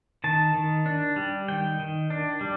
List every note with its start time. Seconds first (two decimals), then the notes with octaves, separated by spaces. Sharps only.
0.24 D#3 A5
0.54 D#3
0.86 D4
1.16 G3
1.48 D#3 G5
1.79 D#3
2.10 D4
2.41 G3